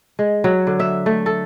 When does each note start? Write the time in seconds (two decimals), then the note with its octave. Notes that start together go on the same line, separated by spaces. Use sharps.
0.19 G#3
0.44 F#3
0.67 D3
0.80 E5
1.06 A3
1.26 A4